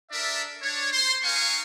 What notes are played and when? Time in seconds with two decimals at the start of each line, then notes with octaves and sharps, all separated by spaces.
0.11 D4 A4 A#4 D5 E5
0.62 D4 C#5
0.91 C5 C6
1.24 B3 D#4 A#4 F5 G#5 C#6